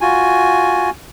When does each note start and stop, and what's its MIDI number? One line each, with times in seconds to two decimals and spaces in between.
0.01 0.90 65
0.01 0.90 66
0.01 0.90 80